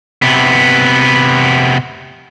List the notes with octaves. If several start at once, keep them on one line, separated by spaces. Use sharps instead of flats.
C3 B3